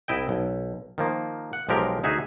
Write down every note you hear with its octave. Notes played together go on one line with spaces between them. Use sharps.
C2 E4 D#5 G5
B1
D#3 F3 A#3
F#5
B1 F3 G#3 G4 A#4
D2 D#4 F#4 G#4 E5